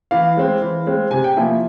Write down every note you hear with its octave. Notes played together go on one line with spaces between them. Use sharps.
E3 F5
G#3 C4
E3
G#3 C4
C3 G#5
G5
F3 A#3 E4 G#5